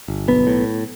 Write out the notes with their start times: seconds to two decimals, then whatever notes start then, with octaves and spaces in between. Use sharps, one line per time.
0.08 G1
0.28 B1 B3
0.47 A2